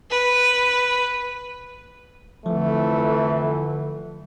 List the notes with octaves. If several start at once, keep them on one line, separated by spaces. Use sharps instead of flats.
B4
F2 D3 E3 F3 A3